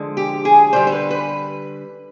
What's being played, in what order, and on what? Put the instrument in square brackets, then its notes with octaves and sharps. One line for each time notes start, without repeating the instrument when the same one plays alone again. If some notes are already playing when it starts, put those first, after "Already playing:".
Already playing: [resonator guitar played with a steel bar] D3 F3 G#3
G4
G#4
D3 G3 C5
C5
B4
B4